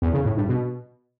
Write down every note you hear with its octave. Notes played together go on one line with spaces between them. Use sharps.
E2
C#3
A2
G2
B2